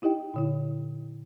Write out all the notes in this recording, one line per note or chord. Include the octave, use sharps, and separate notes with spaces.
D#4 E4 G4 D#5 G5
A#2 D3 E4